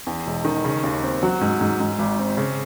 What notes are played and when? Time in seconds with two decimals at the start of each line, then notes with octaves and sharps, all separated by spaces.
0.07 E2
0.27 E1
0.45 D#3
0.64 C#3
0.83 D#2
1.03 C4
1.23 F#3
1.41 G#2
1.61 G#2
1.80 G#2
1.99 G#1
2.19 C4
2.37 C#3